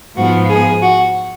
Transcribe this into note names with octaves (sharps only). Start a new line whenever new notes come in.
G#2 F3 B3 F#4
G#4
F#4